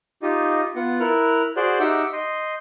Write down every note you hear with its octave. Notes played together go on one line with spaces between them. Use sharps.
D#4 F4 G4 D#5
B3 F4 F#5
E4 A#4 F6 F#6
F#4 G#4 C5 D5 F#6 G6
D#4 G4 E5 F#5 G5
D#5 C6 G6